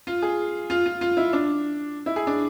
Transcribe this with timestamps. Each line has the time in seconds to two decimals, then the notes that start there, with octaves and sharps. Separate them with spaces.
0.07 F4
0.22 G#4
0.70 F4
0.86 F4
1.01 F4
1.17 E4
1.33 D4
2.06 E4
2.16 G#4
2.27 D4